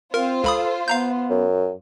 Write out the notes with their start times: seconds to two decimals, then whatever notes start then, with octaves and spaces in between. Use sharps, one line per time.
0.14 C4 F4 A#4 C5
0.44 C#2 A4 B5 D#6
0.88 B3 F5 A#5 G6
1.30 F#2